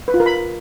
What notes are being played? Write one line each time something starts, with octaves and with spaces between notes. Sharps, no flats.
B4
F4
A#4
B5